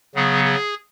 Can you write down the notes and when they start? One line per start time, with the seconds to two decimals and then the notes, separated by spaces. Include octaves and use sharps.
0.15 C#3 F#3 B3 G#4
0.44 G#4